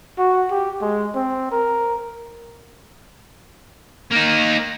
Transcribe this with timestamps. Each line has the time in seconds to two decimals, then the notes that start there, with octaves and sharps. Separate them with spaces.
0.19 F#4
0.51 G4
0.81 G#3
1.15 C4
1.52 A#4
4.12 A#3 D#4